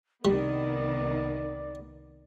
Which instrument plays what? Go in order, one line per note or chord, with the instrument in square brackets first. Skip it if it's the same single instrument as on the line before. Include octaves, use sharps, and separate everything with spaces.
[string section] C2 D#3 B3 [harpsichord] G3 [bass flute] D5